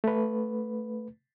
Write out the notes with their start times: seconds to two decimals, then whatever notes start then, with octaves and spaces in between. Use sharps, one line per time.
0.04 A3 B4